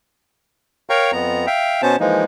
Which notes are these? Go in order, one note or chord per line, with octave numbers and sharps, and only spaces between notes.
A#4 C#5 F5 G5 A#5 C#6
F2 B3 A#5
E5 F5 G5
B2 B3 C#4 C5 A5
E3 F3 G#3 A#3 D#4